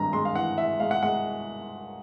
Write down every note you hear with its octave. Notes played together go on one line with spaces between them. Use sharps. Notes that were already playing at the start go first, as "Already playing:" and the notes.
Already playing: G#1 G2 G#3 A#5
G#3 C6
F5
E3 F#5
E3 E5
G#3 F5
F#5
G#3 F#5